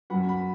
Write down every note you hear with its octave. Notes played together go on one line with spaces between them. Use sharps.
F#2 F#3 F#5 B5
F#5 B5